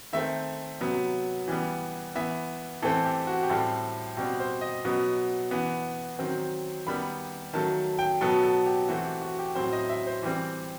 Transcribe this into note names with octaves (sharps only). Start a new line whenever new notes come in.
D#3 A3 C4 E5
C3 F#3 B3
E3 G3 B3
E3 B3 E5
E3 A3 C4 A4
G4
F#4
G4
A2 G3 C4 A4
B2 G3 C4 G4
C5
D#5
B2 F#3 B3
E3 B3
D#3 F#3 C4
D#3 G3 B3 B5
D#3 F#3 A3 A5
G5
B2 F#3 B3 A4
A4
G4
E3 A3 C4 F#4
G4
F#4
G4
A2 F#3 C4 C5
D#5
E5
C5
E3 G3 C4